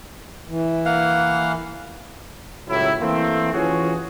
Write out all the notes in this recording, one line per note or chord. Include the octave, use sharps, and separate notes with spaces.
E3
A#3 F5 F#5
C#2 A2 F#3 E4
E3 A3 A#3 C4
E3 C#4 F4 F#4 G#4